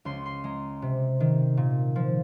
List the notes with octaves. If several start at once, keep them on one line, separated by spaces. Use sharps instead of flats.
C#2 C6
C6
G#3 A#5
C3
D#3
A#2
F3